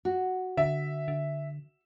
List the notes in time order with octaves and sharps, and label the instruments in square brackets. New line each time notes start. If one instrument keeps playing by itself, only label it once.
[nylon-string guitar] F#4
[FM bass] D3 [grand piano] E5
[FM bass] D3